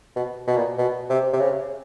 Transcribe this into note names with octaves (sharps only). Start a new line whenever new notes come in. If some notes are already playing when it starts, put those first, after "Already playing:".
B2
B2
A#2
B2
C3
C3
C#3